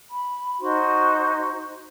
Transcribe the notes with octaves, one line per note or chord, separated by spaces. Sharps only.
B5
D#4 F#4 C5 C6